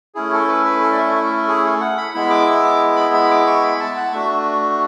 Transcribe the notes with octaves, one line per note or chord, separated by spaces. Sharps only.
A3 C#4 E4 G#4
A4
B4
B4
A4
D5
E5
E5
A4
G#4
A4
F#5
B5
G#3 B3 E4 B5
D6
E6
D6
B5
B5
D6
C#6
B5
A5
F#5
A3 D4 F#4 E5